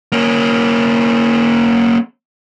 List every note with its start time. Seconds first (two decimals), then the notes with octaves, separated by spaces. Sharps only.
0.12 A#3 C#4